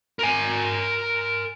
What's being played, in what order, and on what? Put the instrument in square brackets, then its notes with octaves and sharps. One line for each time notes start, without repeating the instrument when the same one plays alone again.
[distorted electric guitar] A#4 G#5